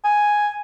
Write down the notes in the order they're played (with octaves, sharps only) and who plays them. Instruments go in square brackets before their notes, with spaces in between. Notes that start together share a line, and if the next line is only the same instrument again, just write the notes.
[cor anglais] G#5